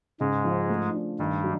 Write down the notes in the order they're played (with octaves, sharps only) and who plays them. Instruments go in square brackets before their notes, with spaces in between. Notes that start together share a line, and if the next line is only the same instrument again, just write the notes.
[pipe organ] G#2 G#3 [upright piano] C#3
[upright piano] F3
A3
D4
[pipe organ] G2 G3 [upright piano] D#3
[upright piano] F#3